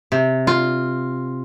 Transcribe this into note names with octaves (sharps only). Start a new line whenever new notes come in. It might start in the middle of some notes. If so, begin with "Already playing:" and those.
C3
F4